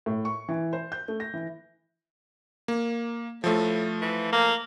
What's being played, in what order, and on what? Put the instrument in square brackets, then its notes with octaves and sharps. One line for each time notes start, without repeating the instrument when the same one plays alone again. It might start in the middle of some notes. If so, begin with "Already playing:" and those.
[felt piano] A2
C#6
E3
C5
G6
A3
A#6
E3
[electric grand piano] A#3
[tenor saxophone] A2 [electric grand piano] F3 A3
[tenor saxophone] E3
A#3